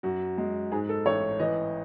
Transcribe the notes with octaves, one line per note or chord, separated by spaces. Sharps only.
F#2 F#4
G#3
G#2 G#4
A4
A1 C#5
E3 D#5